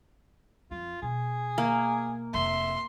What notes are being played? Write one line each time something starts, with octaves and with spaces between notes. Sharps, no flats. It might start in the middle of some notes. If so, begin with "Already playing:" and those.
F2 F4
B2 G#4
A#3
F1 E5 C6